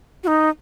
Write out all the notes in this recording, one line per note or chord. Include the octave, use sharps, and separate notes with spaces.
F#4
D#4